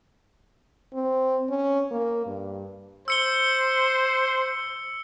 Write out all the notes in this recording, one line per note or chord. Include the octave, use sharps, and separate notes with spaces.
C4
C#4
A#3
G2
C5 E6 C#7 G7